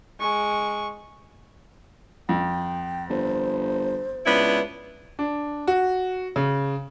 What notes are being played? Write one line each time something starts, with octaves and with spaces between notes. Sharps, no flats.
G#3 C#6
F2 G5
G1 C5
C#2 B3 D4 E4
D4
F#4
C#3